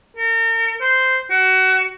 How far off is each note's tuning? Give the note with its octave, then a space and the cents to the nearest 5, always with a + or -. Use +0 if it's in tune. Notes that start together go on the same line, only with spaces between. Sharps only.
A#4 -40
C5 -10
F#4 +25